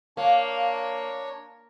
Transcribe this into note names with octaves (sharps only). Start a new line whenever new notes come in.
A#3 D4 C#5